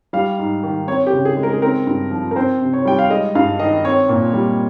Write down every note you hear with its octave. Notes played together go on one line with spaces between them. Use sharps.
G3 F5
G#2
D#3
C4 C#5
G4
C#3
G#4
G#3
A#4
G#4
C4 A#4
G2
F3
A#4
C4 C5
C3
C#5
G3 G5
F5
G#3 D#5
G2 F5
D#3 D#5
C4 C#5
A#2
G3